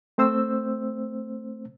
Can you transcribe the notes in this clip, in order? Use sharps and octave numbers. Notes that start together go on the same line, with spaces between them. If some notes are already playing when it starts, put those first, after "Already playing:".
A3 C4 C5 E6